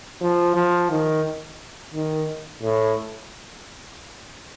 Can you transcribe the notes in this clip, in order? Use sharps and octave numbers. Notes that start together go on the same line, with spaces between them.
F3
F3
D#3
D#3
A2